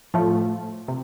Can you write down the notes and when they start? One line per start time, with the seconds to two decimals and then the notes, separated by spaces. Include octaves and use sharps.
0.14 A2 F3 A3
0.88 C3